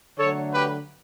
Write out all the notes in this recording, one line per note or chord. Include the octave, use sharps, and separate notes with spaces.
D3 F#3 A3 A4 C#5
G4 B4